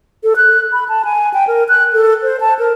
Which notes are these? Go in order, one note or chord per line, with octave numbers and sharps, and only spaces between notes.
A4
F#6
B5
A5
G#5
G5
A#4
F#6
A4
C5
A5
A#4